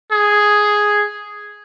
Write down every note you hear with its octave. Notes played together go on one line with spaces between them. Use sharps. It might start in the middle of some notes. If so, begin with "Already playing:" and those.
G#4